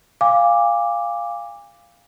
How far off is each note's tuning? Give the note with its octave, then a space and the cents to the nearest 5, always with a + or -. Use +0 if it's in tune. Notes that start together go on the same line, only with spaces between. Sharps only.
F5 +0 G#5 -35 D6 +0